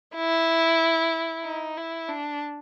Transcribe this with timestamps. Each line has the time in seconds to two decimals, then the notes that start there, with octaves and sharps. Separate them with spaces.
0.16 E4
1.44 D#4
1.77 E4
2.09 D4